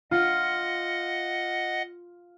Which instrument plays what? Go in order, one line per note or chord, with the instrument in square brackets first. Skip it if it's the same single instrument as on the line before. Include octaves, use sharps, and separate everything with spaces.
[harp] F4 [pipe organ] D#5 F#5